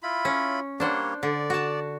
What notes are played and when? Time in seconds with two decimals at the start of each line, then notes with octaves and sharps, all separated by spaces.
0.03 E4 F4 B5
0.25 C#4
0.80 G3 A#3 D4 C5 C#5 F#5
1.23 D3 D5
1.50 F#4 A5